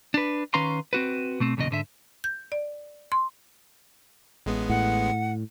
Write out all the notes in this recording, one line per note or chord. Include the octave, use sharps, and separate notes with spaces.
D4 B4
D#3 C#4 B4 F5 A#5 C6
C4 F#4 B4
B2 A3 C4
B1 E2 A#2 C#3 D#5
G#2 D3 E5
G6
D5
C6
A1 G#3 B3
A2 F#5